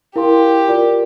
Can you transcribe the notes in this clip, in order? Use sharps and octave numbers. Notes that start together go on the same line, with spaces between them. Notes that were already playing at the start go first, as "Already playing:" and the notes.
E4 G4 A#4 F5 C6
F4 A#4 D5